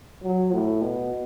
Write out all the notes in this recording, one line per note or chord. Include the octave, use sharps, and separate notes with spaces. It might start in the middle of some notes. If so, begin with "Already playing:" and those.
F#3
A2
B2